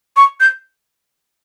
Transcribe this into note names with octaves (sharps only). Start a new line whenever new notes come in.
C#6
G6